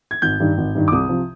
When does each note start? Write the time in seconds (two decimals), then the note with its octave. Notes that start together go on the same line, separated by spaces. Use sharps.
0.11 G#6
0.22 G#1 G6
0.40 G2 D#3
0.58 G#1
0.75 G2 D#3
0.88 D6
0.92 C2 D#6
1.09 C3 F3